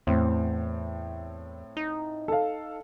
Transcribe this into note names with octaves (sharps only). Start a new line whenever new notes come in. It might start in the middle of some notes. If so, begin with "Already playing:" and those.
E2 A2 C4
D#4
A4 F5